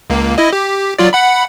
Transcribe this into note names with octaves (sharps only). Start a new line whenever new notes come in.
C#2 A#3
E4 D#5
G4
F#3 F4 D5
F#5 B5